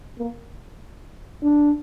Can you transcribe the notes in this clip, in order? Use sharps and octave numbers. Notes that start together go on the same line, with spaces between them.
A#3
D4